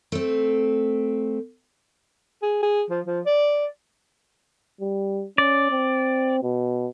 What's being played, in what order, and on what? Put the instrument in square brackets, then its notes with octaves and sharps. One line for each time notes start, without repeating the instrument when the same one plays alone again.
[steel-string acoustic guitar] A3 C4
[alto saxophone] G#4
G#4
F3
F3
D5
[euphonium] G3
[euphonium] C#4 [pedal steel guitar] D5
[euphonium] C4
B2